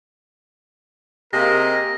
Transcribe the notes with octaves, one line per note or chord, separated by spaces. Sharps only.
C3 A#3 G#4 A#4 D#5 A#6